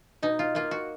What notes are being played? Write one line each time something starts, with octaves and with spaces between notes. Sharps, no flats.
B2 D#4
F4
A#3 F4
F#4